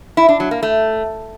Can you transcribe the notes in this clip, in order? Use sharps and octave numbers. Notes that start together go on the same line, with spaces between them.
E4
D4
F#3
A#3
A3